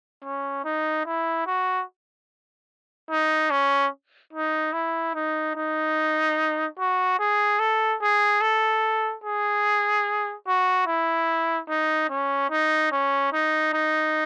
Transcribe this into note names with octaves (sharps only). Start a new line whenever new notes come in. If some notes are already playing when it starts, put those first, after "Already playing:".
C#4
D#4
E4
F#4
D#4
C#4
D#4
E4
D#4
D#4
F#4
G#4
A4
G#4
A4
G#4
F#4
E4
D#4
C#4
D#4
C#4
D#4
D#4